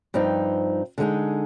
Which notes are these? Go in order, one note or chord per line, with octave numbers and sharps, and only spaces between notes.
G2 F3 C4 D#4
D3 G#3 D#4 G#4